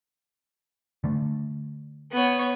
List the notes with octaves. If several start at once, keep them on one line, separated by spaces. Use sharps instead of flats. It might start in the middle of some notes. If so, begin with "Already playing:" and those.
D3 A3
B3 C#5